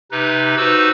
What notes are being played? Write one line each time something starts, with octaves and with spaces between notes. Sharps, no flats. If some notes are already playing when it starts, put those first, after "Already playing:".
C3 D#4 B4
D#4 F#4 B4 C5 E6